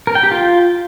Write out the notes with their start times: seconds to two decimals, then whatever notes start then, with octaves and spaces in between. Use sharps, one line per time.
0.07 A#4
0.15 G5
0.23 G4
0.32 F4